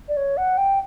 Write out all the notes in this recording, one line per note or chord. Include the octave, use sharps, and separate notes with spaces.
D5
C#5
F#5
G5